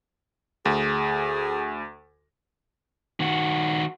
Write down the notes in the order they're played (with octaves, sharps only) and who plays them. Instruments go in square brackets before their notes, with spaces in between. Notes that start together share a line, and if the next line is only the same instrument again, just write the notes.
[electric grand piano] D2 [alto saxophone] G#4
[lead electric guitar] D#3 F#4